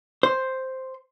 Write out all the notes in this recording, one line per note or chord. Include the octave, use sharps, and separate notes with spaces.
C5